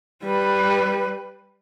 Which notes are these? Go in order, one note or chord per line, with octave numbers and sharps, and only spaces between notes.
G3 B4